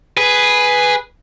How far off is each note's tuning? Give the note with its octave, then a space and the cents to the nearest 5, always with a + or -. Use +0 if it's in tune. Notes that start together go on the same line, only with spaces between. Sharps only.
G#4 +0 B4 +0